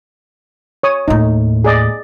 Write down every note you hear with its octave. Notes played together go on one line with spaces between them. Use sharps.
C#5 D#6
D#2 A2 D#4
G#4 D5 D#5